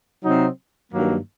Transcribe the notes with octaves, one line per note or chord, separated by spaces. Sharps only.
C3 F#3 C4 D#4
G2 D#3 F#3 A#3